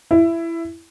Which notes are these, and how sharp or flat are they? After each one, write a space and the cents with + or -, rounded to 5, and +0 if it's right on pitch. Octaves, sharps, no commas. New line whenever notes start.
E4 +15